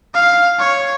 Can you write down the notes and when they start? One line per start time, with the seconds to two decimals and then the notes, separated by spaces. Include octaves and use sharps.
0.14 F5
0.59 C#5